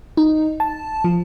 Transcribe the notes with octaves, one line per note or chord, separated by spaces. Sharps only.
D#4
A5
F3